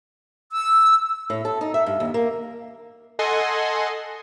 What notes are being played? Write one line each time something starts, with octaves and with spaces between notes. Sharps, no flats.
E6
A2
A4
D#4
E5
G2
D#2
A#3
A4 D#5 F#5 G#5 C6